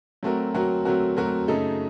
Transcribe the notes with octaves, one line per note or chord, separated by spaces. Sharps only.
F#3 A3 C4 F#4 A#4
F#3 A3 C4 F#4 A#4
F#3 A3 C4 F#4 A#4
F#3 A3 C4 F#4 A#4
F#2 C#3 A3 D#4 A4